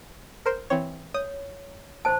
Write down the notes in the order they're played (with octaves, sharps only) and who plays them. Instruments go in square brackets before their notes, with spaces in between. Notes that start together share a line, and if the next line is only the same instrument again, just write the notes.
[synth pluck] A#4 C5
E3 C4 C#5
[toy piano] C#5 [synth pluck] D#6
[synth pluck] A1 D7 [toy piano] C5 A5